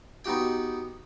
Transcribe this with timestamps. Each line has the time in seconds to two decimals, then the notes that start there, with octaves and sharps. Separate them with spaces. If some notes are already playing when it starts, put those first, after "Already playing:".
0.25 B3 D#4 F#4 G4 G5